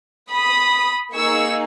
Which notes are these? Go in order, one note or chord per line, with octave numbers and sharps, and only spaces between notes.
B5 D#6
A#3 D#4 G#4 C#6 E6